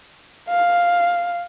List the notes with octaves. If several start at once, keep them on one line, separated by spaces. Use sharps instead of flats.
F5